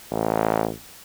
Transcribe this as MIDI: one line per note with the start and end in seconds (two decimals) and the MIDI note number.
0.11 0.71 33